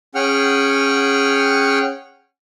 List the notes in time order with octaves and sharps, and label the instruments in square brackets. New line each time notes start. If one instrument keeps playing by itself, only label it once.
[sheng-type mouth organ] C#4 G#4 F#5 G5 F6